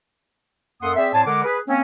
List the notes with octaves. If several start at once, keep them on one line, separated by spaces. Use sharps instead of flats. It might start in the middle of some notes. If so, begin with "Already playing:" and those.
F#2 A#3 A4 F#5 C6 D#6
C4 G#4 D5 E5
A2 C4 D5 G#5 A5
D3 G#3 A#4 F#5 D6
G#4 B4
A#3 C4 C#4